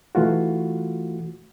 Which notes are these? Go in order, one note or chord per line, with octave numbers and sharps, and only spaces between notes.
E3 A3 F4 F#4